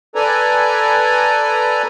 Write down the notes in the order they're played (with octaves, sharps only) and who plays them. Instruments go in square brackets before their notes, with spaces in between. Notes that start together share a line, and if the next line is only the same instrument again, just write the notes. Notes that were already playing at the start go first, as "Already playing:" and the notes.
[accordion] A4 B4 D5 G#5 A#5